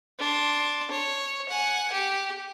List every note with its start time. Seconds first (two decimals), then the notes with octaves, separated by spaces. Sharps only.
0.19 D4 C6
0.91 C#5
1.49 F#5 G#5
1.92 G4